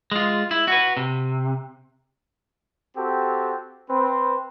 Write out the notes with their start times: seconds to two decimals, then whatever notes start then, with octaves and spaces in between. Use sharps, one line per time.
0.11 G#3 F4
0.51 E4
0.68 F#4 B4
0.97 C3
2.96 C4 F#4 G4 A4
3.90 C4 B4